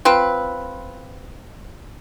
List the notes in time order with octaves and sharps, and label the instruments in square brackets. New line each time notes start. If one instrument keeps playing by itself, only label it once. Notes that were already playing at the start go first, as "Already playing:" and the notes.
[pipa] C4 F4 B4